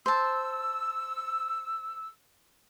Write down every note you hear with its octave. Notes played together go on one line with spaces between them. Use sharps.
C5 A5 E6